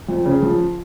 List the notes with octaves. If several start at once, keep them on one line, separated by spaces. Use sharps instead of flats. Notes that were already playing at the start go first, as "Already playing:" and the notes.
F2
C#3
F3